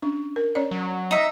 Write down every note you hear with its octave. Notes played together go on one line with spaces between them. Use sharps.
C#4 D4
A#4
C#4 C#5 D5
F#3
D#4 E5